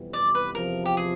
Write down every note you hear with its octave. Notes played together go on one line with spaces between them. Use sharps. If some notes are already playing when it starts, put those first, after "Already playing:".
Already playing: F2 C3 E3 G3 B3
D5
B4
E2 C3 F3 A#4
G4
G#4